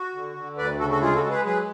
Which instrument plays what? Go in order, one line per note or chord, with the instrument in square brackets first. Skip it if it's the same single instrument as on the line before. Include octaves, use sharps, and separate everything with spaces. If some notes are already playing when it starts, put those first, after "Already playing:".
Already playing: [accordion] F#4
D3
D3
D2 B4 D5
C#3 F#4 A4
F#4 A4
G#3 F4 G#4
F#4 A4
G#3
G#4 B4
F#3 G#4 B4